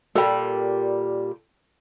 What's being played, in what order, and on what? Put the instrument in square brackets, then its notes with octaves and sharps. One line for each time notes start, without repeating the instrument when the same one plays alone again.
[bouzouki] A#2 G3 [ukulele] A4 G5